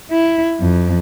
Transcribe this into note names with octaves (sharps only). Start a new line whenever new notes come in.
E4
F2